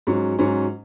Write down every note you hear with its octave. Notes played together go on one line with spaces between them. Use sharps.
G#2 F#3 C#4
G#2 F#3 C#4